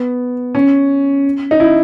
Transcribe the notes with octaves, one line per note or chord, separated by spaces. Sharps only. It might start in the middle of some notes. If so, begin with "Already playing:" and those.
Already playing: B3
C#4
D#4
E4